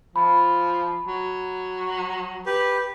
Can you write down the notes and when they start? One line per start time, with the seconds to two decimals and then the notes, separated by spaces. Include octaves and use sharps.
0.16 F3 B5
1.06 F#3
2.46 G4 B4